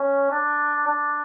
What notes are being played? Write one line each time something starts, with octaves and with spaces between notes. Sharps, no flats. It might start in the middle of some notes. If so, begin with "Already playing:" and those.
Already playing: C#4
D4
D4